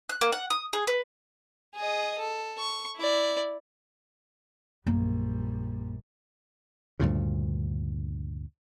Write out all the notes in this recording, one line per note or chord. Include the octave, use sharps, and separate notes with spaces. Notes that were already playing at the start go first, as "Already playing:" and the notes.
F#6
A#3
F#5
D#6
G#4
B4
G#4 D#5
A4
C#6
E4 D5
A#1 F#2 G3 A#3
D2 G2 A#2 C#3